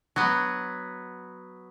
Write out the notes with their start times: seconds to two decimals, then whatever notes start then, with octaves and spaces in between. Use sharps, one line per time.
0.16 F#3 B3